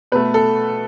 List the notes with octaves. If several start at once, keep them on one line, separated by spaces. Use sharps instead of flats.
B2 A3 B4
A4